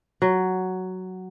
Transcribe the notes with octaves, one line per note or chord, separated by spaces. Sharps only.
F#3